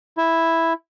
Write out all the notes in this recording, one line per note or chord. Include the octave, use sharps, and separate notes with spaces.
E4